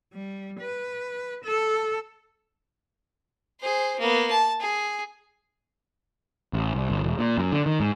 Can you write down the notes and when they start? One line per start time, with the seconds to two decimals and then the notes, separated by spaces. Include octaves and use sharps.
0.13 G3
0.60 B4
1.44 A4
3.60 G#4 C5
4.00 A#3 B3
4.30 A5
4.60 G#4
6.53 A1
6.75 C2
6.90 G1
7.04 E1
7.19 A#2
7.38 F#2
7.52 D3
7.66 D#3
7.80 G#2